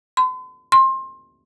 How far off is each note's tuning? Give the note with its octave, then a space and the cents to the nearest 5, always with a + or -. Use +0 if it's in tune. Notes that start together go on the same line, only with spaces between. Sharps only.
C6 -45
C6 +25